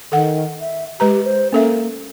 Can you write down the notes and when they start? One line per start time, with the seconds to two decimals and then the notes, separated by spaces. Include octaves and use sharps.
0.12 D#3 A4 F#5
0.61 E5
1.00 G#3 G4 B4 A#5
1.24 C5
1.53 A#3 C#4 A4 E5